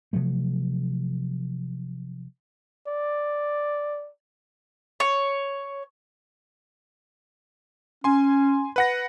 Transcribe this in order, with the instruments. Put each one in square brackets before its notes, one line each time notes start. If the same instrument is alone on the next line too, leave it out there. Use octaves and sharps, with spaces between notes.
[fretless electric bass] C3 F3 F#3 A3
[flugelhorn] D5
[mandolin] C#5
[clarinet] C#4 [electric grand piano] G#5 C6
[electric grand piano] B4 F#5 A#6